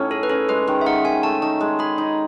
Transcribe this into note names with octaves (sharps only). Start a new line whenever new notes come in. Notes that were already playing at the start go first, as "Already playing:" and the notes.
Already playing: A2 C#4 D#4
G#4 A4
B4
C#4 A4
G#3 B4
D#3
E5
D#3 F#5
D#3 G#5
A3 A5
D#4 A5
G#3
G#4 B5
D#4